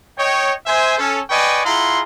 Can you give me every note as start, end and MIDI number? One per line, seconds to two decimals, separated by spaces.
0.18 0.53 73
0.18 0.53 75
0.18 0.53 79
0.67 0.95 72
0.67 0.95 76
0.67 0.95 80
0.98 1.21 61
0.98 1.21 69
1.30 1.63 71
1.30 1.63 74
1.30 1.63 75
1.30 1.63 79
1.30 1.63 80
1.30 1.63 85
1.65 2.02 64
1.65 2.02 65
1.65 2.02 68
1.65 2.02 78
1.65 2.02 82
1.65 2.02 84